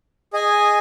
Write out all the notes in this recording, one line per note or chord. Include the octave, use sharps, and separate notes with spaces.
G#4 D#5 G#5